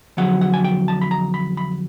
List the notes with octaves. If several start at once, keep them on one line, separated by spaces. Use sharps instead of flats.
F2 D3 F#3 F#5
F#5
G#5
G5
A5
B5
A#5
B5
B5